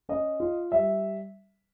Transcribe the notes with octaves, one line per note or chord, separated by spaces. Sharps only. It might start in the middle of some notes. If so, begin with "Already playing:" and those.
C#4 D#5
F4
G3 E5